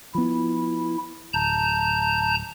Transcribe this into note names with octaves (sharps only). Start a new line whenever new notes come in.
F3 B3 E4
D1 A5 A#5 G6